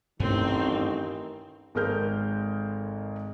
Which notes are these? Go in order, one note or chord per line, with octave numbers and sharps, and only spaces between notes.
A1 G2 D#3 A3 C4
G#1 G#3 A4 A#4 F6 G6